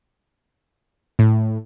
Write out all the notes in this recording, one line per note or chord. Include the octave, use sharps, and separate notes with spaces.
A2